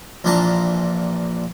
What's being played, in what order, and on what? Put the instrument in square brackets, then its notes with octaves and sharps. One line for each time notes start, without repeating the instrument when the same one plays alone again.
[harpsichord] A#1 A#2 E3 D4 A5 A#5